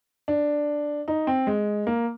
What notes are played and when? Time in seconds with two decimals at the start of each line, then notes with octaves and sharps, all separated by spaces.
0.28 D4
1.08 D#4
1.27 C4
1.47 G#3
1.87 A#3